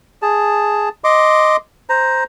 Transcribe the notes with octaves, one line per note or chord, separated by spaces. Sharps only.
G#4 A5
D#5 C6 D6
C5 A#5